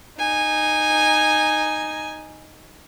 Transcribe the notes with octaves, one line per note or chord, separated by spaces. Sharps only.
D#4 G#5